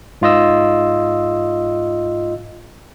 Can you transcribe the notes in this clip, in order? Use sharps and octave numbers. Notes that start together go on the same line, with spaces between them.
G#2 F4 D#5 E6